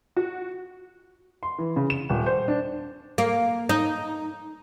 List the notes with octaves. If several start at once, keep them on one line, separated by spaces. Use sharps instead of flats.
F#4
C6
E3
C#3
E7
D#1
C5
D4
A#3
D#4